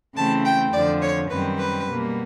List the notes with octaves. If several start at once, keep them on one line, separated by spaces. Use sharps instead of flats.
C#3 E3 A3 C4 A5
G5
F2 D3 F3 D5
C#5
F#2 D#3 G3 C4 B4
B4
B2 G3 A#3